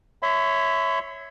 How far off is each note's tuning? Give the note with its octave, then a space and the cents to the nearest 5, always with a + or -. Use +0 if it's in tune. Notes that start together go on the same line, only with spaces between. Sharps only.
C#5 +0 E5 -5 B5 +45